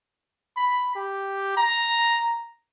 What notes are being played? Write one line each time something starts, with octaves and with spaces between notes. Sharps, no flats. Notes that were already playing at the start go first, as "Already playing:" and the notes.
B5
G4
A#5